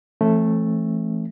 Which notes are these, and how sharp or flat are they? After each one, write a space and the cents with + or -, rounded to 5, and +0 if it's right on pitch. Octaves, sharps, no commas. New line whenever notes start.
E3 +40 A3 +0 C#4 -45